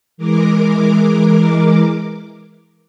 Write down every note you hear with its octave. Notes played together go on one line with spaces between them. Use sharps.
E3 G#3 A#4 D6